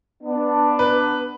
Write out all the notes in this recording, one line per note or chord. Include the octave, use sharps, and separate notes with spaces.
B3 D4
B4